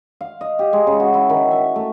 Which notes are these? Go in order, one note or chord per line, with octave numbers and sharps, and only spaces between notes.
F5
D#5
G4
G#3
C#3
F#4
E4
D#3
E5
A3